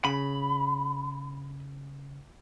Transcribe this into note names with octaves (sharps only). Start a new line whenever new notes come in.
C#3 B5